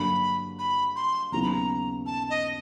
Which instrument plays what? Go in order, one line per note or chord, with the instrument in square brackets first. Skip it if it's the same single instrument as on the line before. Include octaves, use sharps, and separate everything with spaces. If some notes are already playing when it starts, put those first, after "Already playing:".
Already playing: [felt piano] G2 D3 F#3 A#3 D4 [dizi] B5
[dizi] B5
C6
[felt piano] D#2 C#3 F#3 B3 [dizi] A#5
[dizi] B5
A#5
A5
D#5